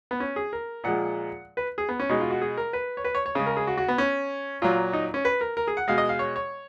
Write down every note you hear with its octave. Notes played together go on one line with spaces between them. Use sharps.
B3
C#4
G#4
A#4
A#2 F3 G#3 F#5
B4
G#4
B3
C#4
B2 G#3 D#4
F4
F#4
G#4
A#4
B4
C#5
B4
C#5
C#5
C#3 G#3
A#4
G#4
F#4
F#4
B3
C#4
A#2 F#3 F4
D#4
C#4
B4
A#4
A#4
G#4
F#5
B2 G#3 F5
D#5
F5
C#5
C#5